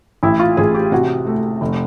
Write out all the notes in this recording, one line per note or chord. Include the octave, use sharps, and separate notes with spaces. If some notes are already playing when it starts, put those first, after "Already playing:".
A1 E4
F4
A1 G#4
G4
C3 F#4
A3
F1